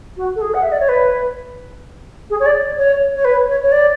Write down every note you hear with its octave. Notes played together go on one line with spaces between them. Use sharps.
F#4
A4
G#4
F#5
E5
D5
C#5
B4
G#4
C#5
D5
C#5
C#5
B4
C#5
C#5
D5